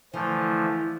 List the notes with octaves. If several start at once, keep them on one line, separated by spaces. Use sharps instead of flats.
D3 E3 F3 A3